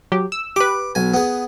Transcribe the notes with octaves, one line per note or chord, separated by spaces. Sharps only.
F#3 G4
E6
G4 B4 D6
B1 G#5
B3 G#4